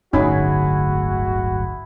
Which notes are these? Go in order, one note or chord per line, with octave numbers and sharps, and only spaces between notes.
D1 G1 D2 C#4 D#4 E4 F#4 G#4